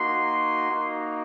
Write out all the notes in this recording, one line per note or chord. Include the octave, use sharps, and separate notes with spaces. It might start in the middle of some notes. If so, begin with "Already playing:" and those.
Already playing: A#3 D#4 F#4 C6
A#3 D#4 F#4